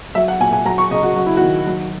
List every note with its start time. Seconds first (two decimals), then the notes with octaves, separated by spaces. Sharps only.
0.15 F#3 E5
0.28 F#5
0.40 A#2 G#5
0.53 G#5
0.65 F#3 A#5
0.78 C#6
0.91 C#3 D#5
1.03 F#4
1.16 F#3 F#4
1.26 E4
1.37 D#3 F#4
1.67 F#3